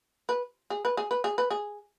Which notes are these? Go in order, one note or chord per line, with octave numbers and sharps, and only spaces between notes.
B4
G#4
B4
G#4
B4
G#4
B4
G#4